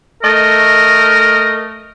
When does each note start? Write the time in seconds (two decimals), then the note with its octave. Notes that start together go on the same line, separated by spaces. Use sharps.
0.23 A3 A#4 D#5